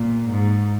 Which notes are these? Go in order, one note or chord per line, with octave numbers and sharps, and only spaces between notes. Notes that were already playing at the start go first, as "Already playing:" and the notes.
Already playing: A#2
G#2